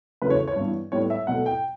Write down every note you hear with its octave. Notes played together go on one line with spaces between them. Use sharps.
E2 C#3 F#3 A3 B4
C#5
C#5
G2 E3 B3
A2 G3 B3 C#5
E5
B2 F#3 A3 F#5
G5